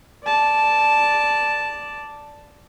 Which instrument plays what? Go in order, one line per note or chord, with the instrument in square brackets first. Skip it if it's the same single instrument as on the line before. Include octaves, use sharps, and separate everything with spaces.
[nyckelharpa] D5 A5